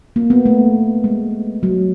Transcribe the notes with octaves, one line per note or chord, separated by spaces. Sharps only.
A#3
B3
A3
G#3
F#3